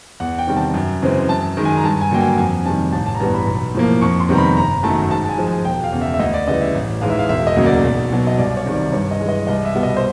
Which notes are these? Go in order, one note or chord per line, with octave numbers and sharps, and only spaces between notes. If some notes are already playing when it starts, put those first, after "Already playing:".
E2 F#5
G5
C3 D#3 G3
A5
F#2
C#3 E3 G#3 C4
F#2 A5
D#3 G#3
G#5
A#5
G2 A5
G#5
D3 F#3 A#3 G5
G#5
F2 G#5
C3 D#3 G3 A5
A1 A5
A5
A#5
G2 E3 G3 B3 A5
B5
B1
A2 F3 A#3
F2 C#6
C6
C3 D#3 G3 B3 A#5
B5
G1 A#5
F#2 D#3 F#3 A3 A5
G#2 A5
A5
G#5
F3 G#3
G#5
E1 G5
F5
E2 C#3
E5
E5
D2 D#5
D5
C#3 E3 G3 D#5
E5
A1
G#2 E3 G#3 F5
E5
F5
E1 E5
D#5
D2 C#3 F#3 A#3
D5
B1
B2 F#3
D#5
C2 D5
C#5
C3 D#3 G3
D5
G2 C#5
D#5
E3 G#3
D#5
C2 D#5
E5
B2 G3 B3
D#5
C5